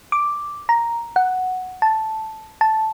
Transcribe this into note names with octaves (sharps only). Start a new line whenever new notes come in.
D6
A#5
F#5
A5
A5